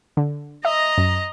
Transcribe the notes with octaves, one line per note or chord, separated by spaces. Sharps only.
D3
D#5 E5 A#5
F#2